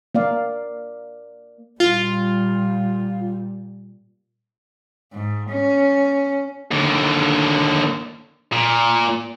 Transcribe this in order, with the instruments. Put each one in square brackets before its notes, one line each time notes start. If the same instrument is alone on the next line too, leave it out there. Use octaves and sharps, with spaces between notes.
[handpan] A#3 D5 F5
[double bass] A#2 G3 [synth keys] F4
[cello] G#2
C#4
[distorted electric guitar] D#2 D3
A#2